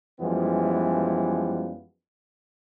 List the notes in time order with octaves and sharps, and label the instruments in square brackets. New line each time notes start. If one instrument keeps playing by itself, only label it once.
[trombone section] F#2 E3 F3 G3 G#3 B3